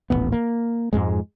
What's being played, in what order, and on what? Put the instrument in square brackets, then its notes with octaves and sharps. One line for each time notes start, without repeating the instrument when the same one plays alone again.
[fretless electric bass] D#1 A1 A#2 B3
A#3
F2 G#2 G#3